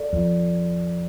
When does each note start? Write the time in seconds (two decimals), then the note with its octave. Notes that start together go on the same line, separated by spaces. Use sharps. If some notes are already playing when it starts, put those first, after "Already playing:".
Already playing: A4 D5
0.13 F2